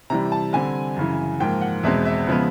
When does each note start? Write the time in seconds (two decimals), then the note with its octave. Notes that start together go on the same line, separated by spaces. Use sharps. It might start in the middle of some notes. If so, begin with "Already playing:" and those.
0.10 C3 E3 G3 A#5
0.32 A5
0.53 D3 G3 C4 G#5
0.97 F#2 C#3 E3
1.40 G#2 F3 A#3 G5
1.61 F#5
1.83 E2 B2 G#3 C4 E5
2.05 E5
2.27 C#3 F3 G#3 B3